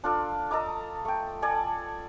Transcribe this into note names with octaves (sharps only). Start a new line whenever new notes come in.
D4 F4 A4 D5
A4 D#5 A#5 D6
A3 G5
A4 D5 G#5 A5